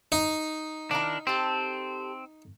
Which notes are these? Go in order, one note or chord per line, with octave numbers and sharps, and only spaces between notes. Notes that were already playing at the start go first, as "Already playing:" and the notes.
D#4
D#3 D4 E4 A#4
C4 G4 A4